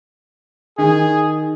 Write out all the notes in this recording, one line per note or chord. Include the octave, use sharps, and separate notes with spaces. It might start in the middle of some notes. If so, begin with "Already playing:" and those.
D#3 G#4